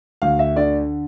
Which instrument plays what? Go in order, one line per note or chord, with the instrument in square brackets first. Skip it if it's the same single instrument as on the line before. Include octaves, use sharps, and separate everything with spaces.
[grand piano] D2 F5
E5
D3 D5